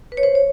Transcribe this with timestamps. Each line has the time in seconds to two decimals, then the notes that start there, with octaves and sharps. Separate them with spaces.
0.12 B4
0.17 C#5
0.23 C5
0.35 C#5